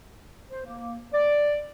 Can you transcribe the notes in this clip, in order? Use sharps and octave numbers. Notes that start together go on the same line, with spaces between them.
C5
A#3
D5